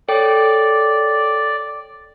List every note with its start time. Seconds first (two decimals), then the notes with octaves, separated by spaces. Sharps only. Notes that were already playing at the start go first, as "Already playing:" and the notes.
0.08 A4 C#5 D5 G5